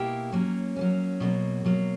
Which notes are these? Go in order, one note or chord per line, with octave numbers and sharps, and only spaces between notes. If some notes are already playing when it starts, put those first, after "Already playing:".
Already playing: B2 A#3 E4 G4
F#3 A#3 C#4
F#3 A#3 C#4
B2 F#3 A#3
B2 F#3 A#3